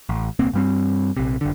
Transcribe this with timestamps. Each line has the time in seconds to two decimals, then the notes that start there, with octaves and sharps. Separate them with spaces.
0.09 A1
0.39 D#1 C2 A#3 C4
0.54 G2 G3 C4
1.16 A#1 C3
1.41 F#1 D3